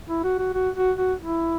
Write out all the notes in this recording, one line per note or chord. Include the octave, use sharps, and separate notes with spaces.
E4
F#4
F#4
F#4
F#4
F#4
E4